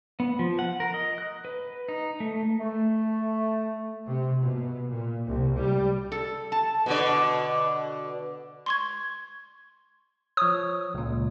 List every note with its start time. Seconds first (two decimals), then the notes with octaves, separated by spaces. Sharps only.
0.20 B3
0.39 F3
0.59 F#5
0.80 A#4
0.94 D#5
1.18 F#6
1.45 B4
1.89 D#4
2.20 A3
2.60 A3
4.08 C3
4.41 B2
4.89 A#2
5.26 C2
5.58 G3
6.12 A4
6.52 A5
6.86 B2 D3 D5
8.66 C6 C#6 G#6
10.37 F3 C#5 D#6
10.94 C#2 A#2